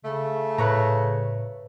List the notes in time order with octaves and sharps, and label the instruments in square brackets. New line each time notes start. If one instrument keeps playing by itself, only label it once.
[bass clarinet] C#3 [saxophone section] A3
[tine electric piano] A2 [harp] B4 C#5 A#5